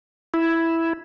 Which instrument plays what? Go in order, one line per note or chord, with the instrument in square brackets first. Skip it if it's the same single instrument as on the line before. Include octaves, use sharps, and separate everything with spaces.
[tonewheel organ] E4